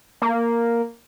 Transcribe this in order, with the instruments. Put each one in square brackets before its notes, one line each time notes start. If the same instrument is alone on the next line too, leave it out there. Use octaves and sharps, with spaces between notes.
[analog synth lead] A#3